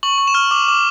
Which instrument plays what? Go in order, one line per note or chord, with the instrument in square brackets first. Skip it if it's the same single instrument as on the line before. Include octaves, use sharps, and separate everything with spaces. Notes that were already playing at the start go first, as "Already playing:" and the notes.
[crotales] C#6 F#7
C#6
E7
F6
D6
D6